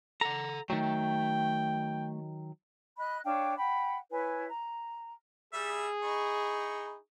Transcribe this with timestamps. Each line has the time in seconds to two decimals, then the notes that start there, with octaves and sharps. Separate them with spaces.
0.21 A4 F#5 A#5
0.70 D#3 F#3 A3 G5
2.98 D#5 B5 F#6
3.23 D4 C#5 F5 G5
3.57 F#5 G5 B5
4.10 E4 B4 C#5 G#5
4.48 A#5
5.53 G3 G#4 E5
6.03 D#4 E4 C#6